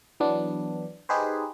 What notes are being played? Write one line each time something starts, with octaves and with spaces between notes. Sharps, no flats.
E3 F#3 B3 D4
D#4 G4 G#4 B4 C5